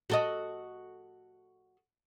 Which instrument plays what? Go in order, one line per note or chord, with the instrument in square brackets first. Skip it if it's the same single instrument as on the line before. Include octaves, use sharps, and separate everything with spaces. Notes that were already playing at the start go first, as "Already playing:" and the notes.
[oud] F#4 A4 D#5